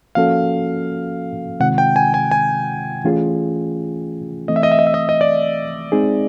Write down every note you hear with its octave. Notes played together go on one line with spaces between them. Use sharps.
F3 A#3 C#4 F#4 A4 F5
C3 D#3 G#3 C4 F4 F#5
G5
G#5
G#5
G#5
E3 A3 C#4 F4 G#4
E3 A3 C4 D#5
E5
D#5
E5
D#5
E5
D#5
D#5
D5
G#3 C4 D#4 G#4